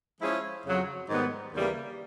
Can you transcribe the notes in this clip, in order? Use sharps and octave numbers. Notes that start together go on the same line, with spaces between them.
F3 G#3 C#4 E4 G#4
F2 C#3 F#3
G#2 D#3 G3 B3
D#2 C#3 E3 G3 A#3